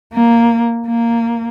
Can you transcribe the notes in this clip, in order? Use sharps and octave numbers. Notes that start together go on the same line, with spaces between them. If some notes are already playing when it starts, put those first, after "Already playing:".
A#3
A#3